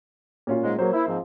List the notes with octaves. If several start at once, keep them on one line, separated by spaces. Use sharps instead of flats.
A#2 C#4 F4
G#2 G#3
F#3 A#3 C5
E4
G#2 F3 C4